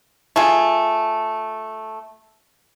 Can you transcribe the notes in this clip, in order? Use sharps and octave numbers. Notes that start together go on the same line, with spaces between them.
A3 F4 G#4